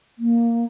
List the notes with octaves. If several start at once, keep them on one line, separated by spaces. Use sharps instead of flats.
A#3